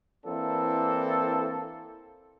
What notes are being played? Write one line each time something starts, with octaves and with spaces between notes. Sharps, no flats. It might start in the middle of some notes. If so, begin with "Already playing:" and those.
E3 A#3 C4 D4 E4 A4